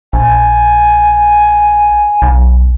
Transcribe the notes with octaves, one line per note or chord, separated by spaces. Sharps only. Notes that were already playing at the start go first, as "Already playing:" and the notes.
A#1 G#5
B1